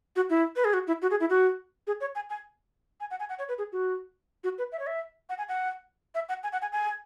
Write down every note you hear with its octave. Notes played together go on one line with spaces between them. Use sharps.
F#4
E4
B4
G#4
F#4
E4
F#4
G#4
E4
F#4
G#4
C#5
G#5
G#5
G#5
F#5
G#5
F#5
C#5
B4
G#4
F#4
F#4
B4
E5
C#5
E5
F#5
G#5
F#5
E5
F#5
G#5
F#5
G#5
G#5